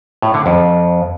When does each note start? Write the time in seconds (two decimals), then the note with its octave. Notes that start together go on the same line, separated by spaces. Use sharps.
0.22 A2
0.34 D3
0.46 F2